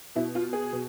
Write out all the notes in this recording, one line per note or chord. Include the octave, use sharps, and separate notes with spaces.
B2 E4
F4
G#4
B2